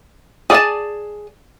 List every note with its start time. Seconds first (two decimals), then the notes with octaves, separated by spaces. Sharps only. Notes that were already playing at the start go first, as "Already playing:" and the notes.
0.50 G#4 D5 F5 G#5 A5